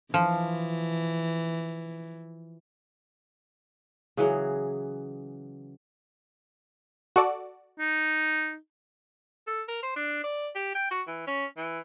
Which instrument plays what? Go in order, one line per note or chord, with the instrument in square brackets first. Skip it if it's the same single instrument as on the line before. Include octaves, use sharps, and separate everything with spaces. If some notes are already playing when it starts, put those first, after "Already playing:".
[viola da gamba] E3 [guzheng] F3
[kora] C#3 E3 F#3 G#4
[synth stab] F#4 A4 D5
[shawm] D#4
[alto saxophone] A4
A#4
C5
D4
D5
G4
G5
F#4
E3
C#4
E3